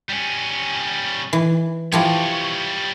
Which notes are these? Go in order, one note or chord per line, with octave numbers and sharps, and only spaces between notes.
G3 C#4
E3
E3 F3 G3 G4 C#5